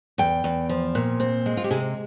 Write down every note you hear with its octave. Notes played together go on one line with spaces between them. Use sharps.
E2 G5
E2
F3
A#2
C4
G#3
F4
G4
C3 G#4